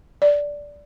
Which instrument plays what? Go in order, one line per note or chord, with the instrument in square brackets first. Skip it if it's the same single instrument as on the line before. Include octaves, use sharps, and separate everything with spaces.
[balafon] D5